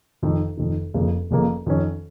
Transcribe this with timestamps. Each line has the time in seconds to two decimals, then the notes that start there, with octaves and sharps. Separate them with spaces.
0.22 F1 F2 D#3
0.57 F1 F2 D#3
0.94 F1 F2 C#3 A#3
1.31 F1 F2 C#3 A#3
1.66 F2 D#3 C#4